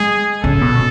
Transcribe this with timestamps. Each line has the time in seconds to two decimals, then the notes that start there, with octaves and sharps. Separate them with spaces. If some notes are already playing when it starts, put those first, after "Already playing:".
Already playing: G#3 G#4
0.44 C#3 A4
0.61 B2